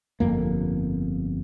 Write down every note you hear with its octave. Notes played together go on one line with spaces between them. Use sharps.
G1 F2 A#3